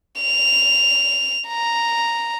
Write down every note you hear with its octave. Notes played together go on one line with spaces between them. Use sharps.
F7
A#5